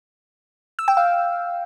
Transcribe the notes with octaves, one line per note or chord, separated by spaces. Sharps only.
E6
G5
F5